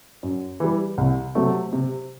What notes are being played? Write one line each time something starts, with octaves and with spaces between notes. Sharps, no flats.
F#2
E3 G3
C2
C3 F#3 A3
C3